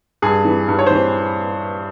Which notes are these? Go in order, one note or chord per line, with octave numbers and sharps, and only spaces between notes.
G2 G#4
E3
G2
C#5
C5
E3